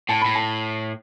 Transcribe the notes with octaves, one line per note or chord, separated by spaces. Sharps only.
A2 A5
A2 B5
A5